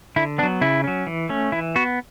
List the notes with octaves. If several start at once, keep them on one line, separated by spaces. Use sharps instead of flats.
D3 E4
F#3 B3 D4
C#3 E4
F#3 C#4
E3
A3 C#4
E3 E4
B3 F#4